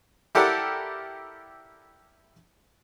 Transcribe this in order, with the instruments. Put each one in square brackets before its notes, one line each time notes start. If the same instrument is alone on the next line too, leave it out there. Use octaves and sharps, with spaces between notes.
[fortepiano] E4 G4 A4 A#4 D5 F#5